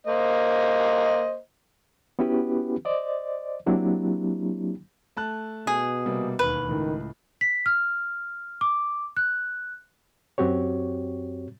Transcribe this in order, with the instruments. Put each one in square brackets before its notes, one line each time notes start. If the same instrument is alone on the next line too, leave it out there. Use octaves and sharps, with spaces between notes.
[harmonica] A#3 C5 D#5
[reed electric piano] B3 C#4 E4 F#4 G4 B4
C5 D5 D#5
F#3 A#3 C4 D4 E4 G4
[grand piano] A3 A5 F#6
[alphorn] B2 [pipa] G#4
[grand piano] C3 G3 A#3
[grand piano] E1 D#2 [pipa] B4
[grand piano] C#2 A2 [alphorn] D#3
[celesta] B6
F6
D6
F#6
[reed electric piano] F#2 C4 F#4 G4 C#5